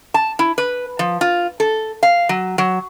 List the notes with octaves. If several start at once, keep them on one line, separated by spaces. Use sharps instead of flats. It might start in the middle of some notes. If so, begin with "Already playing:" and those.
A5
E4
B4
F3
F4
A4
F5
F#3
F#3